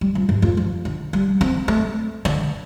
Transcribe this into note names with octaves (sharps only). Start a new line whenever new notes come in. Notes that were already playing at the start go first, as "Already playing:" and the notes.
G3
F2
G2
F2
F3
D3
G3
C4
A3
D3